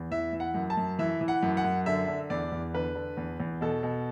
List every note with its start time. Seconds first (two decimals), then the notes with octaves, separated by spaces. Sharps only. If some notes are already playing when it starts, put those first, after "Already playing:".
Already playing: E2
0.11 E3 E5
0.33 E3
0.40 F#5
0.54 F#2
0.70 A5
0.77 F#2
0.99 E3 E5
1.21 E3
1.28 F#5
1.43 F#2
1.57 F#5
1.64 F#2
1.86 D3 E5
2.08 D3
2.30 E2 D5
2.52 E2
2.74 D3 B4
2.96 D3
3.17 E2
3.40 E2
3.61 B2 A4
3.83 B2